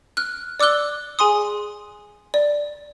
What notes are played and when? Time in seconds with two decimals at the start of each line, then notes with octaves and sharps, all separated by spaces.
0.17 F6 F#6
0.60 D5 D6 E6 F#6 G7
1.19 G#4 G#5 C6 D#6
2.34 D5